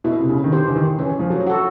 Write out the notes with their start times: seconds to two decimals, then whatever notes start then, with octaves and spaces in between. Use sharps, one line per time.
0.04 B2 E4
0.20 C3
0.29 C#3
0.44 D#3
0.52 D3 G4 C5
0.68 E3
0.76 D#3
0.99 E3 C#4
1.19 F3
1.30 F#3
1.47 F#4 A4